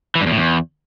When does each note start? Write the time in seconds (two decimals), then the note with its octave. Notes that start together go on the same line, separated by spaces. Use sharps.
0.15 E3
0.21 G2
0.26 E2
0.32 A2
0.37 E2